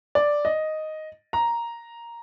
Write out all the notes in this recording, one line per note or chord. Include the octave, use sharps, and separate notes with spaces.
D5
D#5
A#5